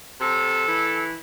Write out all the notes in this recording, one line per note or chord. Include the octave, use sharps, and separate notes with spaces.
C3 A4
E3